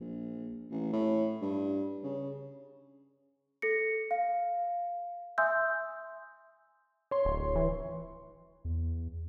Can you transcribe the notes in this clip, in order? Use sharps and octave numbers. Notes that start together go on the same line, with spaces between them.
A#1
A1
A2
G2
C#3
A4 A#6 C#7
F5
E5 G#5 C6 D#6 E6 G6
C#5 C6
D1
E3
E2